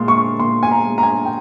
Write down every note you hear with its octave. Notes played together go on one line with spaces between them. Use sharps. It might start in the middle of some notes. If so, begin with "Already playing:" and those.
Already playing: A#2 G#3 C6
C#6
A#2 C6
G#5
A#5
G#3
A#5
G#5
G5